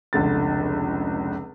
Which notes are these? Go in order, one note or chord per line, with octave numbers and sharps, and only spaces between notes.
F1 C#2 D3 A6